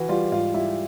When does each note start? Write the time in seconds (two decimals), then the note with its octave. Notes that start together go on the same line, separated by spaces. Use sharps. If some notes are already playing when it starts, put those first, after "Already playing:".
Already playing: E3 F#4
0.09 G3 F4
0.31 G#2 F4
0.54 G3 E4